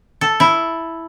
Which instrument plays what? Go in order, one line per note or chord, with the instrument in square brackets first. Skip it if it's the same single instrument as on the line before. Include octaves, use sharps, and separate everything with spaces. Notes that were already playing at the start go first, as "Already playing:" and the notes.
[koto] A4
E4